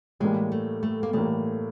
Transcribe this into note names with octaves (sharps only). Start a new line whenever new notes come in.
A2 E3 G3 G#3 A#3
A3
A3
A#3
A2 E3 G3 A3 A#3